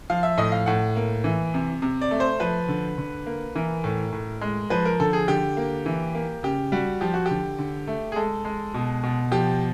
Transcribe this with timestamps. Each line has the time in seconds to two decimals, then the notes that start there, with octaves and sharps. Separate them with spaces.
0.10 F3 F5
0.23 E5
0.37 A2 D#5
0.52 F5
0.66 A2 F#5
0.96 A#3
1.24 E3
1.54 C3
1.82 C3
2.01 D5
2.11 A3
2.20 C5
2.40 F3 B4
2.68 D3
2.98 D3
3.26 A#3
3.55 E3 A#4
3.84 A2
4.12 A2
4.41 G#3
4.70 F3 B4
4.85 A#4
5.00 D3 A4
5.13 G#4
5.28 D3 G4
5.57 A#3
5.86 E3
6.15 A#3
6.43 C#3 G4
6.72 G3 F#4
7.01 F3 G4
7.14 F#4
7.26 D3 G4
7.59 D3
7.87 A3
8.12 G#4
8.16 G#3 A4
8.45 G#3
8.74 B2
9.03 B2
9.31 F3 G4